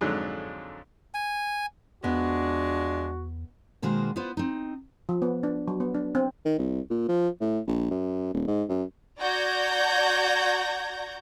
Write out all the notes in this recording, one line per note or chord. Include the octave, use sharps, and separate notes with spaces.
F2 G#2 D3 F#3 D4
G#5
E2 F3 G#3 B3 D4 F#4
B2 D#3 G#3 A#3 F#4 C5
B3 E4 F4 B4 C5
C4 D#4
F3
B3
D4
F#3
B3
D4
C4
D#3
C2
A#2
F3
A2
A#1
F#2
D#1
G#2
F#2
F#4 D5 A#5 G6 G#6 A#6